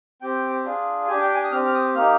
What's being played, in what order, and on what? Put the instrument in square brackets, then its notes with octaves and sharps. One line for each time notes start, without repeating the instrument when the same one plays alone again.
[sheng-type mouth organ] C4 G4 G5
D4 F4 G#4
D4 G4 G#5
G5
G#5
D#6
C4 G4 F6
F6
D#6
A#3 D#4 G4 F6